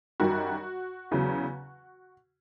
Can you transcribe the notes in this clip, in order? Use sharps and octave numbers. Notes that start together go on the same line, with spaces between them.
F#2 D#3 G3 F#4
E2 C#3 F#3